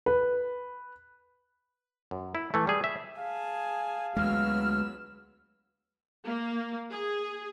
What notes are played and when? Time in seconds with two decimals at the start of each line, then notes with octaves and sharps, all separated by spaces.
0.06 B4
2.11 F#2
2.35 E4
2.54 E3 A3
2.67 G3 G#4
2.84 E5
3.19 G#4 F5 G#5 A5
4.17 D2 F#3 G#3 B3 E6 F6
6.26 A#3
6.91 G#4